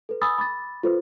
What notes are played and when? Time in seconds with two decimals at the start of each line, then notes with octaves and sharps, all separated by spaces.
0.09 A4 B4
0.22 G#5 B5 D#6 E6 A6
0.38 B5 D6 A6
0.83 F4 A4 B4 C5